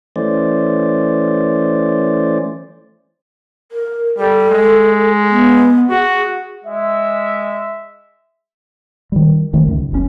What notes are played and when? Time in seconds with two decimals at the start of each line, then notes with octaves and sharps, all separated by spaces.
0.16 E3 A3 C#4 C5 D5
3.72 A#4
4.19 G3 A4
4.50 G#3
5.30 B3
5.90 F#4 G#4
6.64 G#3 E5
9.12 D#3 G3
9.53 D#3 G3 A3 C#4
9.67 C#2 F#2
9.91 F#1 F#2 A2 C#4